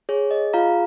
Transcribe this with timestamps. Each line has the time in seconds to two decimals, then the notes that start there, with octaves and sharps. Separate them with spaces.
0.09 G#4 C#5
0.31 D#5
0.54 F4 F5 A#5